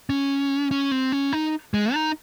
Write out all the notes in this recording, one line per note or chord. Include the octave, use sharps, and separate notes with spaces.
C#4
C#4
C4
C#4
D#4
G#3
D#4